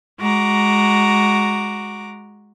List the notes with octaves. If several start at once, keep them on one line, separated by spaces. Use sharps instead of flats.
G#3 F#4 A#5 D6